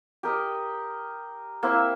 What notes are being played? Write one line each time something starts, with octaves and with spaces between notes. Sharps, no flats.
G4 A#4 D#5
A#3 C4 E4 E5